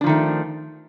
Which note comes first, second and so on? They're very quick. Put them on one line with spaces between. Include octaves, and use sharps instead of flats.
D4 F3 D#3 A3